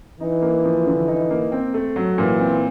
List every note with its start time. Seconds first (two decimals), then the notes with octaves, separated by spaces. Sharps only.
0.20 E3 D#4
0.42 A#3
0.64 F3
0.86 D3
1.08 D#4
1.30 A#3
1.52 C4
1.74 A3
1.96 F#3
2.18 A#2 E3
2.39 C4